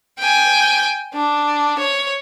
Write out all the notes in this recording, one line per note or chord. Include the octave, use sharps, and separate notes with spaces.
G5 G#5
D4
C#5